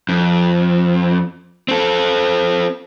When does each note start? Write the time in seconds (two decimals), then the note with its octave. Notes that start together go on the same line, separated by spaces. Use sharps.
0.09 F2
1.68 C4 A4